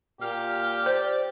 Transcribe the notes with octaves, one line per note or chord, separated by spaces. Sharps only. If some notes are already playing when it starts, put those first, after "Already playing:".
A#2 G4 F6
C5 D5